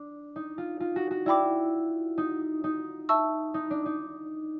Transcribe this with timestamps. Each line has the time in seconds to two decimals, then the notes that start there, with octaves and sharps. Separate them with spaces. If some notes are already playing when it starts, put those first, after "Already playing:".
Already playing: D4
0.36 D#4
0.58 F4
0.80 F4
0.96 F#4
1.11 F#4
1.26 E4 D5 G5 B5 D6
2.18 D#4
2.64 D#4
3.09 E5 A5 C#6 E6
3.54 D#4
3.71 D4
3.86 D#4